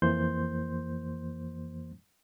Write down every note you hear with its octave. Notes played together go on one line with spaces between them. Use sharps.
F2 E3 A#3 C5 C6 G6